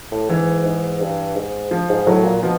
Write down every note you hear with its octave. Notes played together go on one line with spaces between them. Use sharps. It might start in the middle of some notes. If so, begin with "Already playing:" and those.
A2
G#2 E3
G#2
G2
G#2
F3
G#2
A2 F#3
A#2
B2 F3